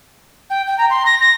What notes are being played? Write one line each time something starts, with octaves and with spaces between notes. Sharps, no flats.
G5
G5
A#5
C6
A#6
A#6